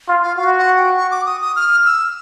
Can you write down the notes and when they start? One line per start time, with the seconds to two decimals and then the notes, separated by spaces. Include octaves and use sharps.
0.08 F4
0.23 F5
0.37 F#4 F5
0.58 F#5
0.77 G5
0.97 C#6
1.11 D6
1.26 D#6
1.42 D#6
1.56 F6
1.86 E6